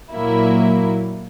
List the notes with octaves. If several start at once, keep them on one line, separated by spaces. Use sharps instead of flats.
A#2 F#3 A#3 E4